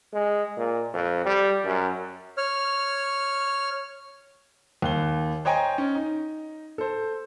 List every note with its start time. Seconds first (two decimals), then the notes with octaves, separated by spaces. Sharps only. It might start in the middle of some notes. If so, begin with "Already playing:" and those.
0.13 G#3
0.57 A#2
0.94 F2
1.25 G3
1.65 F#2
2.37 C#5 F6
4.82 D#2 G7
5.45 C5 C#5 D#5 G5 G#5 A#5
5.78 C#4
5.95 D#4
6.78 A4 C5